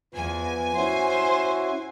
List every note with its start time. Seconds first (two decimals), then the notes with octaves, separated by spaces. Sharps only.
0.14 E2 F3 B3 G#5
0.75 C#4 E4 F#4 C5